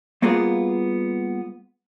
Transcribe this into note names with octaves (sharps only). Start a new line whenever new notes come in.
G3 A#3 B3 F4 F#4 G#4